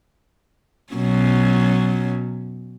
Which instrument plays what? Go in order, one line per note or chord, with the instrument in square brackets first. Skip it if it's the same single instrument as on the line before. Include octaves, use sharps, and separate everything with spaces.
[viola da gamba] B2 F#3 C#4